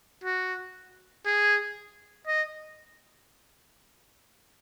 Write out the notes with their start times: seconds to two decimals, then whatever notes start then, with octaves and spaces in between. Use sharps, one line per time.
0.24 F#4
1.26 G#4
2.27 D#5